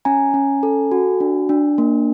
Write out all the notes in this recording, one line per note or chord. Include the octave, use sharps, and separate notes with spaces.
C#4 G#5 A#5
C#4
A4
F#4
D4
D4
A#3